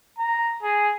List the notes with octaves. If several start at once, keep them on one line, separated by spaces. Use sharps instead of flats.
A#5
G#4